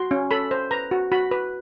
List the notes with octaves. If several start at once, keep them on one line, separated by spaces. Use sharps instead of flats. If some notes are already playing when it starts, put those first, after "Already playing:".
Already playing: F#4 C6
C#4
A4 B5
C5
B4 A#5
F#4
F#4 B5
B4